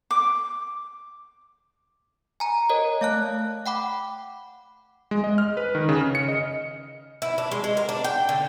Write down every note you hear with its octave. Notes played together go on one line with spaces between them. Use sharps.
D6
G#5 A#5
A#4 C#5 D#5
A3 F5 A5 F#6
F#5 G5 B5 D6
G#3
D#5
F6
B4
D#3
C#3
F6
C#7
D#5
E4
D4
G#3
G#3
A#4
D4
G5
D3